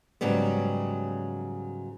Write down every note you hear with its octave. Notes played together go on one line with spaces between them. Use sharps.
G#2 C#3 F#3 G3 B3